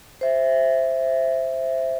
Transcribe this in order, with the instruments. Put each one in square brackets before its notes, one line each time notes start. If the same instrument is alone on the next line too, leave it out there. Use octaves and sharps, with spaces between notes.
[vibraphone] C5 E5